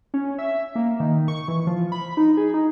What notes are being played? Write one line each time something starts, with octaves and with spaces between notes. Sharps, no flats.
C#4
E5
A#3
D#3
C#6
E3
F3
B5
D#4
G#4
D#4